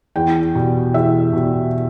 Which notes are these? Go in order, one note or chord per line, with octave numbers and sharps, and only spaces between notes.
E2 G5
B2 G3
E2 E5
B2 G3